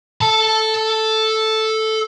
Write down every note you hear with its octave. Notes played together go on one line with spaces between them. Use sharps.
A4 A5